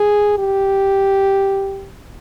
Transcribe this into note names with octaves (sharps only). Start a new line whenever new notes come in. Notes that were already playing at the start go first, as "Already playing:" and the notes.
Already playing: G#4
G4